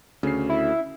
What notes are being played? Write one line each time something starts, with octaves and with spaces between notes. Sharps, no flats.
D2 C#3 C#4 C7
E4